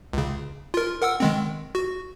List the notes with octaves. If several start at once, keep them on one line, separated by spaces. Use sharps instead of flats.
C#2 C#3
F4 A#4
A#4 F#5 E6
D#3 G#3 C4
F#4